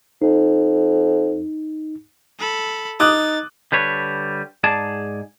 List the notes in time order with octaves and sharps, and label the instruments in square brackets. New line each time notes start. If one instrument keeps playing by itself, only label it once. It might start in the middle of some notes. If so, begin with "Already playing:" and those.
[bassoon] F2 [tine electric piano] D#4
[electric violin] A4 B5
[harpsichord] D#4 [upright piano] D6 D#6 F#6 [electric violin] A6
[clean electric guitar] D3 G3 B4 C#5
G#2 G#4 D5 A5